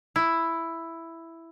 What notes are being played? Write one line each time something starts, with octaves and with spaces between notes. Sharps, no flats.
E4